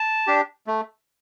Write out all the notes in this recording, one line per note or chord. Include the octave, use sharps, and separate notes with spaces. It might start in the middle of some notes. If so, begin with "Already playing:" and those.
Already playing: A5
D4 G4
A3